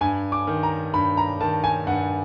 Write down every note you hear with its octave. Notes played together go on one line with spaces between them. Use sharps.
G2 G#5
D6
D#3
A#5
G2 B5
A#5
D#3 A5
G#5
G2 F#5